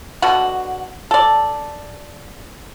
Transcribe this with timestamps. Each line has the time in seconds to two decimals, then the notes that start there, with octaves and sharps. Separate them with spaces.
0.22 B2 D3 F#4
1.11 A4 D5